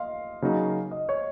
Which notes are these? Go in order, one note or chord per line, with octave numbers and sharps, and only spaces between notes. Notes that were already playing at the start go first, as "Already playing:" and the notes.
Already playing: D#5 F5 C6
C#3 F#3 A#3 D#4
D#5
C#5